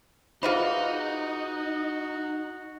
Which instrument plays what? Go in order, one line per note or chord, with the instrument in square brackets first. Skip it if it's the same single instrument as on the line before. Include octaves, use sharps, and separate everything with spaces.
[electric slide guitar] D#4 [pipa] F4 B4 C5 [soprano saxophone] F#4 [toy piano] G#4 E5 B5